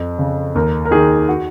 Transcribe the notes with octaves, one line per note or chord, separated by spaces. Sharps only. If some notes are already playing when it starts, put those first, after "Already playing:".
Already playing: F2
C#3
D#2 A#4
A#4
D#3 G#4
F#4